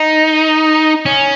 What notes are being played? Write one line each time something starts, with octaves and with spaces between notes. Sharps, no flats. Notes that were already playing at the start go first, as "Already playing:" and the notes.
Already playing: D#4
C#4